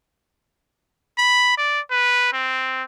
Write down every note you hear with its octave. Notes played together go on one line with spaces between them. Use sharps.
B5
D5
B4
C4